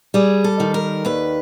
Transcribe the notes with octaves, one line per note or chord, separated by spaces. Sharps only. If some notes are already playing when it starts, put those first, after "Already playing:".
G3 G#4
A4
D#3
A#4
D#2 B4